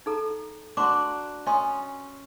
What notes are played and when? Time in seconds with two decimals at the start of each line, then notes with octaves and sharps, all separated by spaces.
0.06 D#4 A4 A#5
0.77 D4 F#4 A#5 C6 D6
1.47 C#4 D#5 C6 D#6